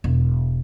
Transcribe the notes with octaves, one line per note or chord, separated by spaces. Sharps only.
E1